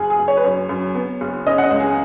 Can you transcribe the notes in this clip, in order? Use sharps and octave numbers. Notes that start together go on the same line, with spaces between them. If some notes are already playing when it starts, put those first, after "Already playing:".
Already playing: F#1 G#4
G#4
F#1
C#5
B4
F#2 C#5
F#2
B3
F#1
C#4 D#5
F#5
D#5
C#2
G#4